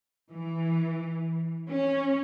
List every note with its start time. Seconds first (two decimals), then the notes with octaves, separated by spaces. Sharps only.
0.30 E3
1.69 C#4